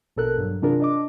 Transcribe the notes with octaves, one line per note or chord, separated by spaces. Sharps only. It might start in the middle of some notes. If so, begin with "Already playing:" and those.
A#1 B2 A4 A#4 F#6
G2 F#3
C3 E3 D4 F4 G#4 A#4
D4 D#5 D6